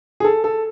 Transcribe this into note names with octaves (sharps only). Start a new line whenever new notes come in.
G#4
A4
A4